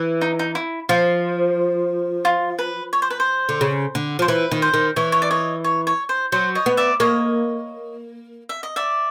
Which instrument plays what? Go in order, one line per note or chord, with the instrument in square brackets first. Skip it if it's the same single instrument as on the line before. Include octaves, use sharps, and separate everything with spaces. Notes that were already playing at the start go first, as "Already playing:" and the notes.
Already playing: [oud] E3
[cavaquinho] D#4
D#4
E4
[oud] F3 [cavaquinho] F4
[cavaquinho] F4
B4
C#5
C5
B4
C5
[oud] D3
C#3
D3
[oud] F3 [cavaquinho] C5
[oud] E3 [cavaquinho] B4
[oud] D#3
[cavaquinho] C5
[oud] D#3
[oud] E3 [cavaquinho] C#5
[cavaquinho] C#5
D5
C#5 D#5
C#5
C#5
C5
[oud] F#3 [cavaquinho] C5
[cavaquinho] C#5 D#5
[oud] B3
[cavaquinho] D5 E5
[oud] A#3 [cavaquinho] C#5 D#5
[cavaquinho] E5
D#5
D5 E5